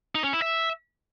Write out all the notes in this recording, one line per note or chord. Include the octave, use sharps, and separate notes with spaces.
D#4
C#4
E4
E5